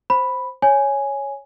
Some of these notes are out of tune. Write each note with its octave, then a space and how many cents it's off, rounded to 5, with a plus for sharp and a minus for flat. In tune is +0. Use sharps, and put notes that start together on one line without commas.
C5 +5 B5 +0
C#5 +0 G#5 +0